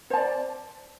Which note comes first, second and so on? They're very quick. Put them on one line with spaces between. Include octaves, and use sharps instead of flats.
C5 A5 D5